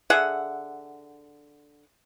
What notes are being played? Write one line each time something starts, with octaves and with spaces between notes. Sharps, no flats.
D3 G#4 E5 F#5